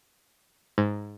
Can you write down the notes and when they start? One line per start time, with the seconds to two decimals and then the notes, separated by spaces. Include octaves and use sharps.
0.78 G#2